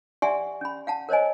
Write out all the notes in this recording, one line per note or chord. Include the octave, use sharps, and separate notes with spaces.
G4 D5 E5 F#5 G#5 C6
C#4 B5
F5 F#5 A5
A#4 C5 C#5 D#5 G#5